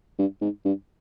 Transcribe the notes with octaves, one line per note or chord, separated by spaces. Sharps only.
G2
G#2
G2